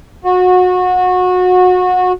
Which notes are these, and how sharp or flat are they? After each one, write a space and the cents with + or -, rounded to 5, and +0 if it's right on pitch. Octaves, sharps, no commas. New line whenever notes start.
F#4 -25